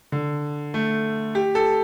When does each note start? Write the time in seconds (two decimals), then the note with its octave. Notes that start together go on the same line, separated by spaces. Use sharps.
0.12 D3
0.74 A3
1.35 G4
1.55 A4